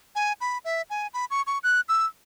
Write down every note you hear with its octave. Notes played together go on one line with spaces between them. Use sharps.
G#5
B5
E5
G#5
B5
C#6
C#6
F#6
E6